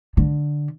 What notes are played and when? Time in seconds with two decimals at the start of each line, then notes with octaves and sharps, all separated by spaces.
0.17 D3